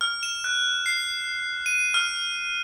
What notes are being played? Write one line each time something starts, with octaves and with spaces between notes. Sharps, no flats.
F6
E7
F#6
C7
D#7
F6